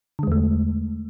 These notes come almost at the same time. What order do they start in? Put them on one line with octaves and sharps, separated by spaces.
D3 G#3 E2 A3